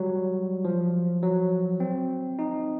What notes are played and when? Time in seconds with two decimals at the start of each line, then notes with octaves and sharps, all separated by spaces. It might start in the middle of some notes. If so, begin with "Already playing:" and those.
Already playing: F#3 G3
0.65 F3
1.22 F#3
1.80 C4
2.39 D#4